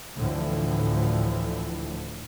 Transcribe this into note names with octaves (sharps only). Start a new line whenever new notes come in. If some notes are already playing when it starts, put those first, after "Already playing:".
D2 A2 D3 E3 F3